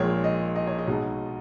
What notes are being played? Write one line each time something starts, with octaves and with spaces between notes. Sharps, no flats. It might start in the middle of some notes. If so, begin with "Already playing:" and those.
Already playing: A#1 A#2 G#3 C#5
D#5
D#5
C#5
D#5
B1 B2 G#3